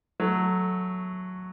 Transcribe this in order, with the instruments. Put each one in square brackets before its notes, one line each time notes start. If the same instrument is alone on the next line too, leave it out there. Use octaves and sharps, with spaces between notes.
[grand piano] F#3 A3